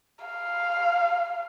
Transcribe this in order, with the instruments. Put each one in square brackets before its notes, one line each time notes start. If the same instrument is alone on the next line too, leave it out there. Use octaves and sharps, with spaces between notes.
[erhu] F5